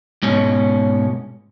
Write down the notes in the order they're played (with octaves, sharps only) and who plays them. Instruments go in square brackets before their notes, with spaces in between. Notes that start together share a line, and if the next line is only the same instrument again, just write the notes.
[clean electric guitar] G#2 B2 C#4